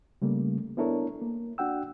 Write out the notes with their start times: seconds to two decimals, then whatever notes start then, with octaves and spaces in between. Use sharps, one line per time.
0.22 C#3 G3 A3 A#3
0.77 B3 D4 E4 A4 A#4 C#5
1.21 A#3
1.58 D4 F#4 F#5 G5 E6